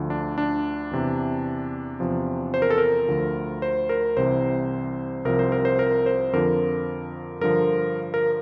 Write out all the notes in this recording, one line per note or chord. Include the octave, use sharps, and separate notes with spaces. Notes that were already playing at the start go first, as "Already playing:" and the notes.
Already playing: D2 D3 F3
D4
D4
E2 C3 E3
E2 C3 F3
C5
A#4
A4
A#4
D2 D3 F3
C5
A#4
C2 C3 E3 C5
C2 C3 F3 A#4
C5
A#4
C5
A#4
C5
F2 D3 F3 A#4
G2 D3 F3 A#4
A#4